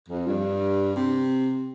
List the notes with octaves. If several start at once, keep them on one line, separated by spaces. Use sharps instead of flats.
F2
G2
C3